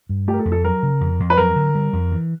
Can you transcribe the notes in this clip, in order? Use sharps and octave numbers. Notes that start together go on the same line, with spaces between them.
G2
A3 G4
A#4
A4
F2
A4
F#3 A#4
C#3
F2
F2
B4
F#3 A#4
D3
G3
F2
E3